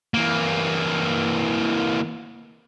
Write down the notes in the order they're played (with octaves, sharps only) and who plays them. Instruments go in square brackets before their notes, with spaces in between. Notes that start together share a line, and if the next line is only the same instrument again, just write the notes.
[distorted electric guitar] E3 A#3